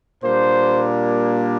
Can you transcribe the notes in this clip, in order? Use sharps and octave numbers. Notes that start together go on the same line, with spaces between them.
A#2 G3 A#3 D4 C5